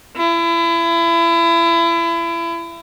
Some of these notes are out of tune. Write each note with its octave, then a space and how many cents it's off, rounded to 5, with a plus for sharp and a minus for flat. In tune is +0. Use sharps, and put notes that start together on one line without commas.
E4 +30